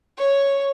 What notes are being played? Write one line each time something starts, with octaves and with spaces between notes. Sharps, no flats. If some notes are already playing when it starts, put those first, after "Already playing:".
C#5